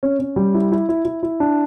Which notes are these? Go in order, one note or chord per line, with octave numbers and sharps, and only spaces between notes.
C#4
C#4
G3
E4
E4
E4
E4
E4
D4